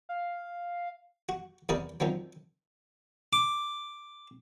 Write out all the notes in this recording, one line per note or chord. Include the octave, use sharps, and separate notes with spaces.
F5
F#4
E2 C3 G#4 A#4 D5 D#6
D#3 F3 F#3 C4
D6